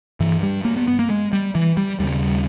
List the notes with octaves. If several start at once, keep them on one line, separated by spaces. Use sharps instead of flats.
G2 E3
G3
A#3
B3
B3
A#3
G#3
G3
E3
G3
D#2 C#3 G3